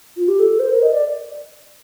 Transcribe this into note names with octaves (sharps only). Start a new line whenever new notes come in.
F4
G4
A4
C5
A#4
D#5
D5